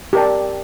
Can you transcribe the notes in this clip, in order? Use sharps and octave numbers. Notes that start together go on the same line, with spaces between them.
G4 A#4 D5 A5